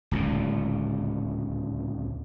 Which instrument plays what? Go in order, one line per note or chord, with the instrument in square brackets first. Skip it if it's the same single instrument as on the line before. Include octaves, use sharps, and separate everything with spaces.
[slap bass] D1 C#2 A#2